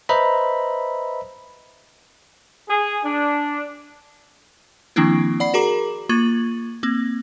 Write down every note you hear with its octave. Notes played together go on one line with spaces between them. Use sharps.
B4 C5 D#5 E5 A#5 B5
G#4
D4
D#3 F3 A#3 C4 D4 E4
D5 F#5 B5 C7
F#4 G#4 A#4 A#5 D6
A#3 F4 C#6 G#6 A6 F#7
A#3 C4